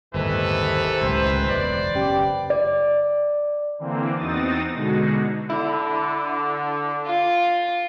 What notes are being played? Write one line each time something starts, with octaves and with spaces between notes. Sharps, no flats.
G1 D#2 A2 C3 D#3 E3 A4 B4
F#1 C#2 A2 C5
E1 B1 B4 D5
F#1 C#4 G4
D5
D3 E3 A#3 C4
E2 C4 D#4 F#4 D#6 A6
B2 D3 G#3 D#4 F#4
D3 E4
F4